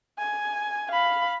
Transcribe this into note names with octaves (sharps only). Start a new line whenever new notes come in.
G#5
F5 B5